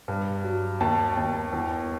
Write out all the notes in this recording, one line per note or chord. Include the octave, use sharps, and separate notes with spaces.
G2
F#3
D#2 A5
D#2
E2